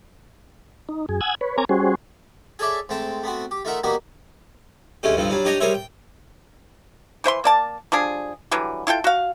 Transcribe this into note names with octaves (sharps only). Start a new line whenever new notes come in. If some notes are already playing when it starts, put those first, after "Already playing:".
D#4
F#2 G#4
F#5 G#5 D#6 E6 G#6
B4 C#5
C4 A#4 C#5 G#5 A#5 D6
G3 C#4 F#4 G#4 C5
G#4 A4 C#5 D5 E5
G#2 A3 C4 G5 A5
A3 B3 C4 F#4
G4
A3 D#4 F4 A#4 E5 F#5
G3 A#3 B3 D#4 F#4 G4
D2 G#3 A3 C#4 G4
G2 D3 F3 C4
F#3 G3 D4
D4 G4 C#5 D#5 G5 A#5
G3 G#4 A#4 C5 C#5 E5
G5
E3 C5 E5 C6
A#3 D5 A5
F3 G3 D4 G#4
D3 E3 F#3 G3
E4 F4 A4 G5
F#4 F5